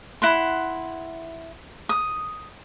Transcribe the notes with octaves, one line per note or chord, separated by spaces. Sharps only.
E4 F#5 C6
D#6